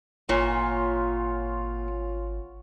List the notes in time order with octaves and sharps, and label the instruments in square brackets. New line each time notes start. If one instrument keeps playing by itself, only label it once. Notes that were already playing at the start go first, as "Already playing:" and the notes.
[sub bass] G#1 [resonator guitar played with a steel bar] A#2 [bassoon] F4 [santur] C#5 F#5 G#5